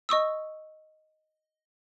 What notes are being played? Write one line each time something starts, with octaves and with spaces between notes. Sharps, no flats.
D#5 C#6 D#6 E6